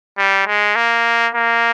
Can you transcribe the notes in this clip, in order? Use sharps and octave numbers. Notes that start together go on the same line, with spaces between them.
G3
G#3
A#3
A#3